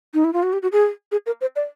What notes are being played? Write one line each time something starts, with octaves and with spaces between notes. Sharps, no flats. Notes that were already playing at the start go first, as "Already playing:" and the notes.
D#4
E4
F4
F#4
G4
F#4
G#4
G#4
A#4
C5
D5